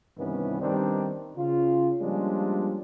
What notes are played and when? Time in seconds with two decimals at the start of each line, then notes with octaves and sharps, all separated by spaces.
0.18 G2 C3 D#3 E3 B3 C#4
0.61 D#3 G3 B3 C4 D4 D#4
1.36 C#3 F4
2.00 F3 G3 G#3 A#3 C#4 D4